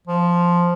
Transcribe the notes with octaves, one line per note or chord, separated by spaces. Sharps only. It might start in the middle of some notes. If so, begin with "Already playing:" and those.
F3